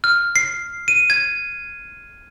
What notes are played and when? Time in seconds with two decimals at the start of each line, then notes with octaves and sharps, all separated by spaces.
0.04 F6
0.36 C7
0.88 D#7
1.10 G#6